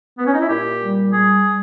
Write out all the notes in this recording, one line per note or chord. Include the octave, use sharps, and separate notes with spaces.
B3
C#4
D#4
E4
A#2 G4
G3
G3 G#4
G3